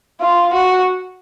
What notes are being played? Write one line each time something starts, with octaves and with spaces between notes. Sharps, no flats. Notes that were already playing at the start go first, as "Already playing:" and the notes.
F4
F#4